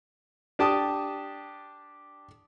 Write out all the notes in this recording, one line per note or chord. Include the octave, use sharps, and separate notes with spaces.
D4 G4 A5 D#6